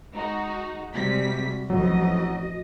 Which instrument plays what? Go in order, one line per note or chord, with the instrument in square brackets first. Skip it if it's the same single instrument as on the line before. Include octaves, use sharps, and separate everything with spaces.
[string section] G#3 D#4 F#4
[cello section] C3 G3 G#3 [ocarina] F#4 [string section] B6
[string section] A1 F2 E3 [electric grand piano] F#3 [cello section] D#5